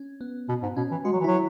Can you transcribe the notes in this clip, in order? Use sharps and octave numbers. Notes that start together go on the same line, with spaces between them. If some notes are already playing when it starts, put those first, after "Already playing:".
Already playing: C#4
B3
B2
G#2
B2 C#4
E3
G#3 F#4
F#3
E3
F#3 E4